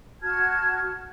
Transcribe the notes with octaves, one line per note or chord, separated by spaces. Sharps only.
F#4 A5 F6 G#6